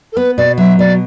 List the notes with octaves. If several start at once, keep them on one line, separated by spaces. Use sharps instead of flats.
A4
B3 B4
B2 D5
F#3 E5
B2 D5